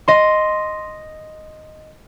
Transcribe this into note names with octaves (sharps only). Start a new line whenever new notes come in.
D#5 C6